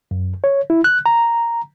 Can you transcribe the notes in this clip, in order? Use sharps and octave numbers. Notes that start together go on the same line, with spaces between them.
F#2
C#5
E4
F#6
A#5